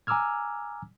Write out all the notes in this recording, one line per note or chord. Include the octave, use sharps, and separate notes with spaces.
G#5 A#5 D6 E6 F6 G#6